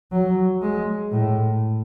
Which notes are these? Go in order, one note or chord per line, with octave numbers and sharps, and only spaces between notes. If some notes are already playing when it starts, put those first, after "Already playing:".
F#3
G#3
A2